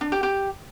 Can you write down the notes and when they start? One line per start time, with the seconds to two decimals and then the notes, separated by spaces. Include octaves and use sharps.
0.01 D4
0.12 G4
0.23 G4